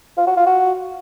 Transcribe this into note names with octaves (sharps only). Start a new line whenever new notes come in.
F4
F#4
F4
F#4